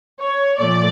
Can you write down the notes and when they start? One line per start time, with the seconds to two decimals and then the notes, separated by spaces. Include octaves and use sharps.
0.19 C#5
0.58 A#2 F3 A3 D5